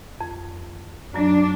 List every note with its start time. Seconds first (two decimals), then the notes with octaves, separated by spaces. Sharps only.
0.21 F2
1.14 F#2 F#3 D4